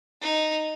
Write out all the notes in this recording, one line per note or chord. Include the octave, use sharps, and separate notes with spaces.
D#4